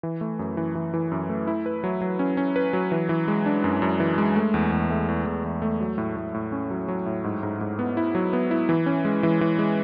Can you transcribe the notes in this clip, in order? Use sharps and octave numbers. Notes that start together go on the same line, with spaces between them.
E3
A3
F#2
E3
E3
E3
F#2
A3
E4
B4
F#3
F#3
C#4
C#4
B4
F#3
E3
E3
G#3
D4
F#2
F#2
E3
G#3
A3
E2
E2
A3
E2
E2
E2
A3
F#3
A2
A2
A2
C#4
F#3
F#3
A2
G#2
G#2
G#2
B3
E4
F#3
B3
E4
E3
C#4
G#3
E3
E3
G#3